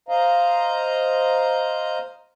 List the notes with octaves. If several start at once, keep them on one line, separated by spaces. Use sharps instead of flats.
C5 D#5 F5 A#5